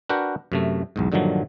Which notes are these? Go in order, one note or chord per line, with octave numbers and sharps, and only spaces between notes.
D4 F#4 A#4 B4 F#5 G5
F#2 C3 A3
B1 E2 G#2
G2 A#2 D3 D#3 F3 F#3